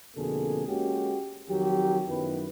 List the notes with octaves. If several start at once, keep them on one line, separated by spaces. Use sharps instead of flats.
F2 B2 D3 A#3 G#4 A4
G#3 A#3 C#4 F#4 G4
F2 D#3 F#3 G4
F#2 D#3 B3 E4 B4